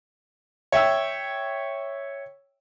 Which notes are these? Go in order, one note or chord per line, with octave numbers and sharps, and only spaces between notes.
C#5 E5 G5 E6